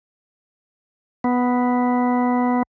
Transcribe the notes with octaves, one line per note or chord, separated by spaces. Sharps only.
B3